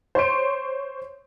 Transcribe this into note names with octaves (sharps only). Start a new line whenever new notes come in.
C5 C#5 C6 D7